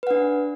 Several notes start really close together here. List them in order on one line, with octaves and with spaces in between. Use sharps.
B4 F#5 D4